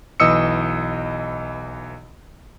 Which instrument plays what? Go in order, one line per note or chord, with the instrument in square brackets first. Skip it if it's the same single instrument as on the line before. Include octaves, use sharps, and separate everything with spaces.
[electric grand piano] B1 E3 D#5 D#6 E6 C#7